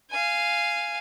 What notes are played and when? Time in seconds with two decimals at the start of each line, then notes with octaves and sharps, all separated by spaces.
0.11 F5 G#5